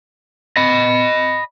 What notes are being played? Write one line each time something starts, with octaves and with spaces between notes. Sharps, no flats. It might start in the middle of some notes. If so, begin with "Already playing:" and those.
D#5 B5